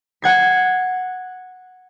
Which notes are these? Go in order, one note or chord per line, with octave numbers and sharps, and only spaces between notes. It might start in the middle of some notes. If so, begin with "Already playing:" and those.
F#5 G#6 C7